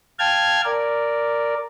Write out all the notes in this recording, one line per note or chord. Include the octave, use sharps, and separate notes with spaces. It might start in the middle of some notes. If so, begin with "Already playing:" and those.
F5 G5 A5 F6 G#6
A#4 D5